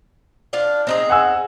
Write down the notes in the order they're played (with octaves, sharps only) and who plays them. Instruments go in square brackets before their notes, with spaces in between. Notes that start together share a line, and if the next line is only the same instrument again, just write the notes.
[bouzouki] D4 F4 F5
C4 D#4 G#4
[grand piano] F#5 G#5 E6